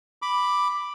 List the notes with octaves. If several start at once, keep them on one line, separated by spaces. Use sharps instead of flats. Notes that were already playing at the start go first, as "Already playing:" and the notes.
B5 D6